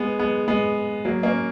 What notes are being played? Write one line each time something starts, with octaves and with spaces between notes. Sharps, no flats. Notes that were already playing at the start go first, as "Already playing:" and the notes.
Already playing: G#3 B3
G#3 B3
G#3 B3
F#3 A#3
A#3 C#4